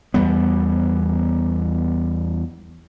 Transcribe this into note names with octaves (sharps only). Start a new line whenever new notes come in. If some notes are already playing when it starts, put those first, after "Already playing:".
E2 G3 B3